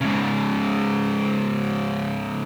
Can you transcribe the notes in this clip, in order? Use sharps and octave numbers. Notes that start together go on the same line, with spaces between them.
G#2 C#3